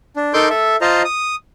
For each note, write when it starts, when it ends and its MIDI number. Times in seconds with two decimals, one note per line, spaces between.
0.16 0.33 62
0.34 0.49 63
0.34 0.49 69
0.34 0.49 70
0.34 0.49 84
0.34 0.49 86
0.34 0.49 91
0.50 0.76 69
0.50 0.76 76
0.81 1.02 65
0.81 1.02 72
0.81 1.02 75
0.81 1.02 81
0.81 1.02 82
1.05 1.35 87